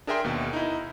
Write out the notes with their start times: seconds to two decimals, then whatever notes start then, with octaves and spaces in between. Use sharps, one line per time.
0.07 D4 G#4 A#4 E5 G5 C6
0.24 D#2 B2
0.53 D#4 E4